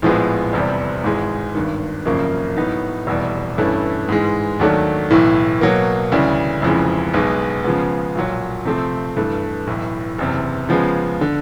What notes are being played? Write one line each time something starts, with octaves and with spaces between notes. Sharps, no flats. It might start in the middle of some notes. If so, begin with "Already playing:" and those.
A#1 A2 F3 G#3 B3
F1 E2 C3 E3 G3
G#1 G#2 E3 G#3
G#1 G2 D#3
G#1 F#2 C#3 F3 A#3
A2 F#3 B3 D#4
F1 E2 B2 G3
G2 E3 A3 C#4 E4
G#2 E3 G#3
D#2 D#3 F#3 A3 D4
B1 A2 E3
B2 F#3 A#3
D2 C#3 E3 G3
F1 F2 C#3 E3 G#3
B1 B2 G#3 B3 D#4
C#3 F3 G#3 B3
B1 A#2 F#3
C3 F3 A3 C4
G2 E3 A3
B1 A2 E3
F#1 E2 C3
C#3 F3 G#3 B3
D3